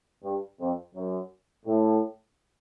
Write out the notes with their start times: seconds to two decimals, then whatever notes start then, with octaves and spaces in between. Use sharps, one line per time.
0.24 G2
0.60 F2
0.95 F#2
1.66 A2